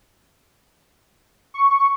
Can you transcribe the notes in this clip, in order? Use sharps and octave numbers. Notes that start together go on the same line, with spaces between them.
C#6